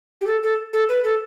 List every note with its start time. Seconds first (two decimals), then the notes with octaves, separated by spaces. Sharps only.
0.21 G4
0.27 A4
0.43 A4
0.73 A4
0.89 B4
1.04 A4